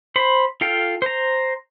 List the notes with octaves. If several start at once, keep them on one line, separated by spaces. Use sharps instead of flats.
C5 B5
F4 A4 F5 G5
C5 A#5